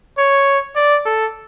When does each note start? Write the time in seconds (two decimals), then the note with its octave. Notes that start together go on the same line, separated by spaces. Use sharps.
0.18 C#5
0.76 D5
1.06 A4